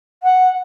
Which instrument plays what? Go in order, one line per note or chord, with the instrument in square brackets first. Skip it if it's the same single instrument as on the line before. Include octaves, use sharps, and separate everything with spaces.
[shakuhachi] F#5